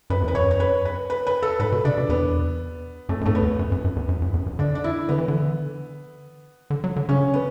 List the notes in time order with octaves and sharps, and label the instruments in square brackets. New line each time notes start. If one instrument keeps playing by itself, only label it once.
[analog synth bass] F#2 [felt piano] B4
[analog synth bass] E2
[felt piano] B4
[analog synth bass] F#2 [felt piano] C#5
[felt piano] C#5
B4
B4
B4
B4
A4
[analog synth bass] G#2 [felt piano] B4
[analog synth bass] B2
[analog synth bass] C#3 [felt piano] D4
[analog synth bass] B2
[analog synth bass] E2 [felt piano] B3
[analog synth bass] F#2 [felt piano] A3
[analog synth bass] F#2
[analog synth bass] G#2 [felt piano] A3
[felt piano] B3
[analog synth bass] E2
F#2
F#2
F#2
E2
F#2
F#2
E2
F#2
[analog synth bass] D3 [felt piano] D4
[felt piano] D4
E4
[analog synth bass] D3 [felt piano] B3
[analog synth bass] E3
D3
D3
F#3
D3
[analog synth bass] C#3 [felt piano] C#4
[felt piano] B3